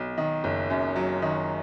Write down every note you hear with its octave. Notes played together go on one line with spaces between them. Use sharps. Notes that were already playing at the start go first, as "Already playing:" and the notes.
Already playing: B1
D#3
F#1
F#2
F#3
D#3